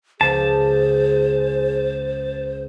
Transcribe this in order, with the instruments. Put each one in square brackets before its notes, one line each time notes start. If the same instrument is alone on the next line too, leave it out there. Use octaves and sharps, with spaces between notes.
[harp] C#2 [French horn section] G#4 [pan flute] C5 [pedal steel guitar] A5